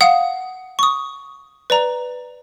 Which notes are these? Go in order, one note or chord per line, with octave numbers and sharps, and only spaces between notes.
F5 F#5 D#6
C#6 D#6
B4 D5 A#5